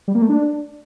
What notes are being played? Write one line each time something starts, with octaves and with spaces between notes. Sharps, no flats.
G3
A#3
A3
D4